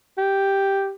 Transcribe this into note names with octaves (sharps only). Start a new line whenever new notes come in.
G4